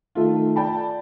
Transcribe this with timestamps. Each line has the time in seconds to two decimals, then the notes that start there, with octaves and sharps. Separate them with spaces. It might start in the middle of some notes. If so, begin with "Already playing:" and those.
0.15 D#3 A3 F4
0.56 D5 G5 A5 B5